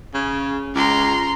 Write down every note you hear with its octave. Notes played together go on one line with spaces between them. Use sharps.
C#3
C#2 A#5 C6